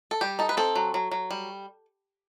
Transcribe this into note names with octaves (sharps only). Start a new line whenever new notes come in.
A4
G3 G4
D#4 A4
B4
C4 A4
F#3
F#3
F#3
G3